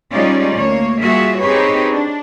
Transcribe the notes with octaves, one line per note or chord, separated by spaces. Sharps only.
G3 G#3 C#4 D#4 F4 D5
D2 A#3 C#5
G3 A#3 F4 F#4 G#4 E5
C4 D#4 G4 G#4 B4 C#5
D4